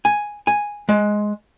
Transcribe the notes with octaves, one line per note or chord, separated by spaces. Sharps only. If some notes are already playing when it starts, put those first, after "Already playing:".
G#5
G#5
G#3